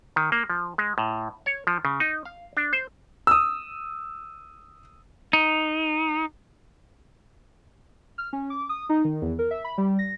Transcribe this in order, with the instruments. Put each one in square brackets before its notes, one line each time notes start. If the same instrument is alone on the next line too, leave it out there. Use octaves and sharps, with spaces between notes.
[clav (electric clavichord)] D#3
A#3
F3
G#3
A2
C#5
F3
C#3
D#4
F5
D4
C5
[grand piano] D#6 E6
[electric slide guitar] D#4
[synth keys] F6
C#4
D6
D#6
D#4
D#3
E2
A#4
E5
B5
G3
A#6